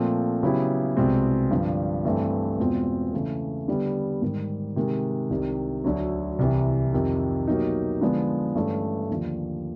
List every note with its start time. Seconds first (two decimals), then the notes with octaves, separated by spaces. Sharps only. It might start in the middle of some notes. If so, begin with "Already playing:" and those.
Already playing: A#2 F3 A3 C4
0.43 C#3 F#3 B3 E4 G4
0.97 C2 B2 G#3 C4
1.51 G2 D3 F3
2.05 G2 E3 A3 C4
2.59 E2 B2 G#3 C4 F4
3.13 C#3 E3 A3
3.68 D3 G3 B3
4.22 G#2 D#3 G3
4.76 C3 D#3 G#3
5.30 C2 C3 D#3
5.84 D2 D3 F#3
6.39 C2 C3 E3
6.93 F2 C3 D#3
7.47 B2 F#3 A#3 D#4 G4
8.01 D3 F3 G#3 B3
8.55 G2 E3 A3 C#4
9.10 D#2 D3 F3